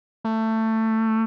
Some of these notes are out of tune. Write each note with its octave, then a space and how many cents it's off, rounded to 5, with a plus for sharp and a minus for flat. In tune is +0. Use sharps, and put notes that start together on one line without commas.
A3 +15